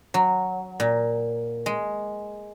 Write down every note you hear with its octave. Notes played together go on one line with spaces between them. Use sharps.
F#3
A#2
G#3